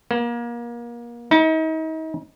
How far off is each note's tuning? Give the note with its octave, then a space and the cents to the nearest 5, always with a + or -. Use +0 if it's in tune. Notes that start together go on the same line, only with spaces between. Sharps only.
A#3 +30
D#4 +40